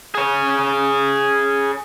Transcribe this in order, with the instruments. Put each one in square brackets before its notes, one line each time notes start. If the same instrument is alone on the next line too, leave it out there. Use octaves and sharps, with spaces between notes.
[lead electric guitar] G#4 C#5